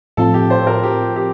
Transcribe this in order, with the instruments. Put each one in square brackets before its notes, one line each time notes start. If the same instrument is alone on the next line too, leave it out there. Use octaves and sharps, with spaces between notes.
[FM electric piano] A2 F3 C4 F4 [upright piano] A4
[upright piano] G4
C5
A#4
G4
G4